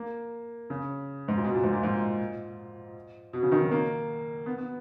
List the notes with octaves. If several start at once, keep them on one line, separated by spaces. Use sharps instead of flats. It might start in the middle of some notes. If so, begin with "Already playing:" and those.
Already playing: A#3
C#3
G#2
A#2
B2
A#2
G#2
A#2
G#2
B2
C#3
D#3
F#3
A#3
B3
B3